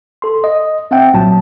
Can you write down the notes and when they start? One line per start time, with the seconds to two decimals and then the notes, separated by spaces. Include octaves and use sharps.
0.22 A4 C6
0.44 D#5
0.91 C4 E5 F#5 G5
1.13 B1 A#2 F#3 A5